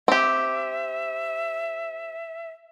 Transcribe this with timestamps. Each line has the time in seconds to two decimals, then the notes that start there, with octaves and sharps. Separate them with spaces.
0.08 C4 G4 E5